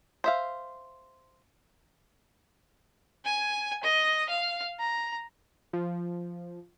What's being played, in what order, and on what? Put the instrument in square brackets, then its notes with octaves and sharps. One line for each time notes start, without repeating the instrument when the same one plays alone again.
[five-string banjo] C5 E5 F5
[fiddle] G#5
D#5
F5
A#5
[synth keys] F3